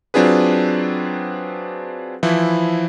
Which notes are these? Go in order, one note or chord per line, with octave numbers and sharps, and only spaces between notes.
F#3 C4 D4 F4 G#4 B4
E3 F3 E4